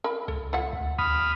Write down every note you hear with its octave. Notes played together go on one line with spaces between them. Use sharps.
A#4 B5
C#2 A4
F4 E5 F#5
D2
D#2 B5 D#6 F6